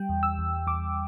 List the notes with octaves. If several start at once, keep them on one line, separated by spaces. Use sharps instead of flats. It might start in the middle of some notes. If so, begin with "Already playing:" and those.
Already playing: G3 G5
E2
E6
E2
E2 D6